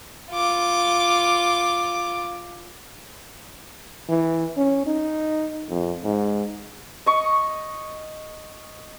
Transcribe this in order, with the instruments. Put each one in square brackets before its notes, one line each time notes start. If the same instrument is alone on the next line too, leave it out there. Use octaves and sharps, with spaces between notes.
[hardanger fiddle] F4 D6
[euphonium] E3
C#4
D#4
F2
G#2
[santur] D#5 C#6